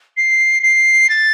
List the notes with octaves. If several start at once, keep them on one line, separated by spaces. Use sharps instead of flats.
C7
C7
A6